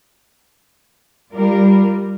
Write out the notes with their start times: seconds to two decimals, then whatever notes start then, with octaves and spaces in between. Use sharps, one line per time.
1.33 G3 F4 A#4 D5